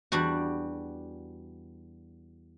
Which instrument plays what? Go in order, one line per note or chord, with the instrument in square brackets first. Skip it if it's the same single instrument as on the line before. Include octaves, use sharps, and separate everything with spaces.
[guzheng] E2 G3 D4 F#4